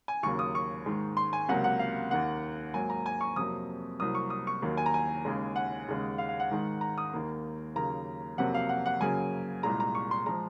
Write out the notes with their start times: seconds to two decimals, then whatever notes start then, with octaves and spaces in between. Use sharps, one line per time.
0.08 G#5
0.23 D#2 C#3 F#3 A#3 C#6
0.39 D#6
0.55 C#6
0.86 G#2 D#3 G#3
1.17 C6
1.33 G#5
1.49 C#2 C3 F#3 A#3 F#5
1.64 F#5
1.79 F5
2.11 D#2 D#3 A#3 F#5
2.74 G#2 F#3 A#3 G#5
2.90 A#5
3.06 G#5
3.21 C#6
3.36 F2 C3 F#3 A#3 D#6
4.00 C2 C3 F#3 A#3 D#6
4.15 C#6
4.30 D#6
4.47 C#6
4.62 D#2 D#3 F#3 A#3
4.77 G#5
4.86 A#5
4.94 G#5
5.25 D#2 C#3 G#3
5.56 F#5
5.88 D#2 C#3 G#3
6.18 F5
6.29 F5
6.40 F#5
6.50 G#2 D#3 G#3
6.81 A#5
6.98 D#6
7.13 D#2 D#3 A#3
7.75 D#2 C#3 F#3 A#3 A#5
8.38 F2 C3 F#3 A#3 F#5
8.54 F5
8.69 F#5
8.86 F#5
9.01 F#2 C#3 F#3 A#3 G#5
9.63 C2 A#2 G#3 A#5
9.80 A#5
9.95 C#6
10.11 C6
10.26 F3 G#3 A#5